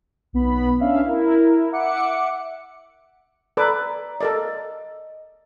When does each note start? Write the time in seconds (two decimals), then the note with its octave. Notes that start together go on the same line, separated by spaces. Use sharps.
0.33 B1 B3 B5
0.80 C#4 D4 E5 F5
1.04 E4 A#4
1.72 E5 F#5 D6 C#7
3.57 A4 B4 D5 A#5 D6
4.21 A4 A#4 D5 D#5